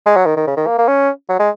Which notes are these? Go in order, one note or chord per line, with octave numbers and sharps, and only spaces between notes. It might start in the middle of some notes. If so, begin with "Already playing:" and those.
G#3
F#3
D#3
D#3
C#3
D#3
A#3
A#3
C#4
F#3
G#3